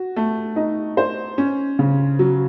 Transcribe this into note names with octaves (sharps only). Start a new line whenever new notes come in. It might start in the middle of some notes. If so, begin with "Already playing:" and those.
Already playing: F#4
A3
D#4
C5
C#4
C#3
F#3